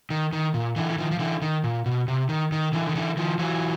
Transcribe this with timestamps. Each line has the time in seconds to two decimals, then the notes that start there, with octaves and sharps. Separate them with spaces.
0.10 D#3
0.32 D#3
0.54 A#2
0.76 D3 E3
0.91 E3
0.98 D#3 F3
1.11 F3
1.19 D3 E3
1.42 D#3
1.64 A#2
1.86 B2
2.08 C3
2.29 D#3
2.52 D#3
2.73 D3 E3
2.89 D#3
2.95 D3 E3
3.17 D#3 F3
3.39 E3 F#3